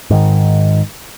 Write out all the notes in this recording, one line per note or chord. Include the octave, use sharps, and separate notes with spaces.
G#2 D#3